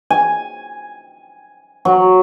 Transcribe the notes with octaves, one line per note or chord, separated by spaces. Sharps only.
G#5
F#3